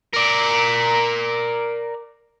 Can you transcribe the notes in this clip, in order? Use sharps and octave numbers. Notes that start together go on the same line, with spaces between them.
A#4 D5